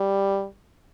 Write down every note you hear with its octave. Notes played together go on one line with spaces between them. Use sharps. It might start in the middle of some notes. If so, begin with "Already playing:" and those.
Already playing: G3